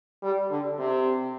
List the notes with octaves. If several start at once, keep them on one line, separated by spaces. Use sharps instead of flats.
G3
D3
C3